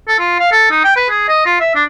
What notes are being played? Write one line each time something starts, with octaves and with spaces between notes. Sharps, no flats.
A4
F4
F5
A4
D#4
G5
B4
G#4
D#5
F4
E5
D4